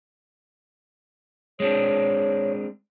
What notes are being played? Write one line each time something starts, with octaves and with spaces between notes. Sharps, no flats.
G#3 C4 D4 C#5